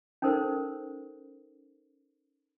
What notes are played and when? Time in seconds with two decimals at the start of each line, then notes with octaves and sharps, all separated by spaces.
0.22 C#4 D#4 A4 A#4 C5